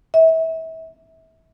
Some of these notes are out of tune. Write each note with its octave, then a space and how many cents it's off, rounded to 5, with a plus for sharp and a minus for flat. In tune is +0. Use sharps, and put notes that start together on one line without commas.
E5 -30